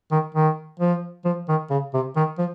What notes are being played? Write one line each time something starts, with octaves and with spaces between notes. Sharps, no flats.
D#3
D#3
F3
F3
D#3
C#3
C3
D#3
F3